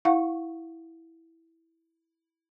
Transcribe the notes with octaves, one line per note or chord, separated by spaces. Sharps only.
E4 F5 F#5 C#6